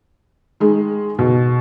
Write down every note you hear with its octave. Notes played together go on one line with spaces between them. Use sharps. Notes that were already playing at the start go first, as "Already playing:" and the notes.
D#3 G#3
B2